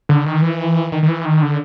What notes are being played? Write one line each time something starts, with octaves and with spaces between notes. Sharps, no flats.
D3
D#3
E3
D#3
D#3
E3
D#3
D3